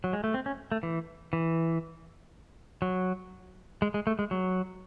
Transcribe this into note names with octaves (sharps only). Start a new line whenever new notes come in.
F#3
G#3
A3
C4
C#4
A3
E3
E3
F#3
G#3
G#3
A3
G#3
F#3